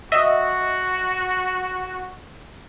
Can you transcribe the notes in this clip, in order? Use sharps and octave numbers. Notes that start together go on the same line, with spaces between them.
F#4 D#5 E5